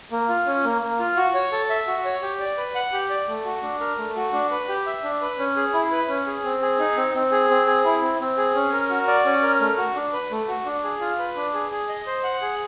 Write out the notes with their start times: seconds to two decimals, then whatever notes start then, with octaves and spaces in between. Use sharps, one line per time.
0.12 A#3
0.29 F4
0.46 C#4
0.64 A#3
0.82 A#3
0.99 F4
1.17 F#4
1.34 C#5
1.52 A4
1.70 E5
1.87 F#4
2.05 C#5
2.22 G4
2.40 D5
2.57 B4
2.75 F#5
2.93 G4
3.10 D5
3.28 A3
3.45 F#4
3.63 D4
3.80 A#4
3.98 A3
4.16 F#4
4.33 D4
4.51 B4
4.68 G4
4.86 E5
5.03 D4
5.22 B4
5.39 C#4
5.56 G#4
5.74 E4
5.92 B4
6.09 C#4
6.27 G#4
6.44 C4
6.62 G#4
6.79 D#4
6.97 C4
7.15 C4
7.32 G#4
7.50 C4
7.67 G#4
7.85 E4
8.02 C4
8.20 C4
8.38 G#4
8.55 C#4
8.72 A#4
8.90 F#4
9.08 D5
9.25 C#4
9.43 A#4
9.60 A3
9.78 F#4
9.95 D4
10.13 B4
10.31 A3
10.48 F#4
10.66 D4
10.84 G#4
11.01 F4
11.19 B4
11.36 D4
11.54 G#4
11.71 G#4
11.89 D#5
12.07 C5
12.24 F#5
12.42 G#4